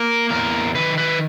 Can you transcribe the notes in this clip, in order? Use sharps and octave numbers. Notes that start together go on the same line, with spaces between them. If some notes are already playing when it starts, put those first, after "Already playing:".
Already playing: A#3 A#4
E2 A#4
D#3 B4
B4